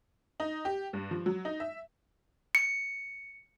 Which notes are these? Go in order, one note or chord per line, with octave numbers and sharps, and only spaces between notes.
D#4
G4
G2
F3
F#3
D#4
E5
C#7